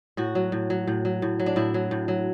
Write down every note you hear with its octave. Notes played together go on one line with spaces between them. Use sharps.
A2 F#4
F#3
A2
F#3
A2
F#3
A2
F#3
D4
A2 E4
F#3
A2
F#3